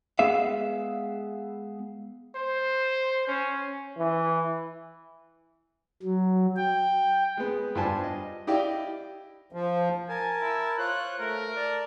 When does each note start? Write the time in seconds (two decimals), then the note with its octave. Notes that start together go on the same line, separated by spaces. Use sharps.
0.19 G#3 B3 G#4 E5 F5
2.35 C5
3.27 C#4
3.98 E3
6.03 F#3
6.57 G5
7.37 G#3 B3
7.75 G2 F4 C5 G#5 A5
8.03 D#5
8.47 E4 G4 D5 D#5 F5 G5
9.52 F3
10.09 A#4 G#5 A5
10.41 E4
10.78 F4 C5 C#5 F#6
11.20 A3 A#4
11.56 D5 A5